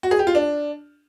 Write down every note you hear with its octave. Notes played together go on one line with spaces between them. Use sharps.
F#4
G#4
G4
F4
D4